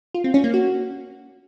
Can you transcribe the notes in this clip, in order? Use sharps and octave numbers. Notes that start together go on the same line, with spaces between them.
F4
C4
C#4
A#3
F#4